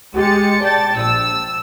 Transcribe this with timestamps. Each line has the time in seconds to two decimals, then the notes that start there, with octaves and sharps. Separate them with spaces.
0.16 G#3 G4 A6 C#7
0.63 D5 G5 A5 A6
0.96 A#1 E6